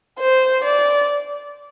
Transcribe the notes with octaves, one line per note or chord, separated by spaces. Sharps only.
C5
D5